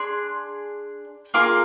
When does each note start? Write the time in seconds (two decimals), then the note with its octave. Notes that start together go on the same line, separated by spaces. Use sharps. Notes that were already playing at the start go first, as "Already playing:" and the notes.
Already playing: D4 G#4 C6
1.34 A#3 F4 G#4 D6